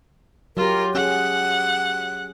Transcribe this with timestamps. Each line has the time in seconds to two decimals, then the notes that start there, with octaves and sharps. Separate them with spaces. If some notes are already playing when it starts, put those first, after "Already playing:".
0.57 F#3 F4 G4 A#4
0.95 C#4 G#4 F#5 F#6